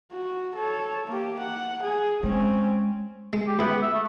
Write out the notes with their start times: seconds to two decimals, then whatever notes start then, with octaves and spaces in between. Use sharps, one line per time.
0.12 F#4
0.56 A4 C#5
1.07 A#3 G4
1.40 F#5
1.83 G#4
2.23 G#3 C4 C#4
3.33 G#3
3.47 G4
3.59 C#2 B3 E4
3.82 E5
3.94 A3